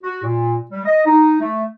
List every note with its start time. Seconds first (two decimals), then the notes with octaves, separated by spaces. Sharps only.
0.02 F#4
0.23 A#2
0.70 G3
0.85 D#5
1.05 D#4
1.40 A3